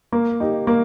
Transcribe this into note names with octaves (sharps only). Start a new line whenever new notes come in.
A#3
D#4 G4
A#3